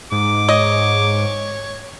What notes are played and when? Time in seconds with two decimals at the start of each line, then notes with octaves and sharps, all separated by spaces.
0.12 G#2 D6
0.49 C#5 D#5